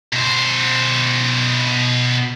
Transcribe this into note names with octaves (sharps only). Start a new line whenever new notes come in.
B2 C5